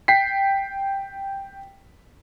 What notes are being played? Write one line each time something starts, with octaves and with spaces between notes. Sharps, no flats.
G5 B6 C7